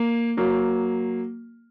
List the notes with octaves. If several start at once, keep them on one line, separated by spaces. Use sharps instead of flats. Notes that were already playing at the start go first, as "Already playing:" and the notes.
Already playing: A#3
F#3 A#3